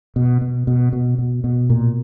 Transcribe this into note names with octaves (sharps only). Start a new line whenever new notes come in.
B2
B2
B2
B2
B2
B2
A#2